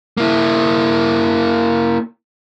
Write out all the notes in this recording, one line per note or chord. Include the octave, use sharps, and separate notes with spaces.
A#3 E4